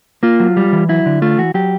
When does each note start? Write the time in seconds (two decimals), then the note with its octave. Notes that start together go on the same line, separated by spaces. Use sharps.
0.23 A#3 F4
0.40 F#3
0.57 G3
0.72 E3
0.89 F#3 E4
1.06 D3
1.22 A3 F4
1.38 E3 F#4
1.54 F#3 G4